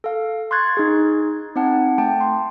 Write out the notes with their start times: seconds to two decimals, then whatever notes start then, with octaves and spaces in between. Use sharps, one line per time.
0.04 A4 F5
0.51 C6 C#6 F#6 G#6 A6
0.77 D#4 G#4
1.56 C4 D#4 F#5 A5
1.98 A3 G5 A5
2.21 C6